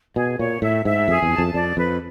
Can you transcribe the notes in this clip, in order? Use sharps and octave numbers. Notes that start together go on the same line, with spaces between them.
B2 G#4
A#2 C#5
A2 E5
G#2 E5
F2 G#4
E2
A5
F2
F2 D5
F2 B4